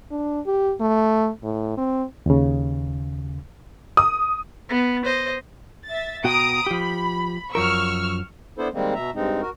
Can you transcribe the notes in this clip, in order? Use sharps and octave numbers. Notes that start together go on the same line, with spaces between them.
D4
G4
A3
A2
C4
D#2 C#3
D#6
B3
C5 D#5
E5 A6
B2 F#4 G5 A#5 D#6 D7
F3 G4 B5
F#2 F3 A#4 C#6 E6 F6
B3 D4 E4 A4 C5
D#3 G3 G#3 A#3 C4
B2 E5 A#5
G2 G#3 C4 D#4
F#4 A#4